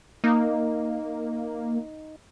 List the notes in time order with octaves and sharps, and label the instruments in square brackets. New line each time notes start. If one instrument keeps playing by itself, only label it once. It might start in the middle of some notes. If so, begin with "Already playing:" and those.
[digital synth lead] A#3 [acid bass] D#4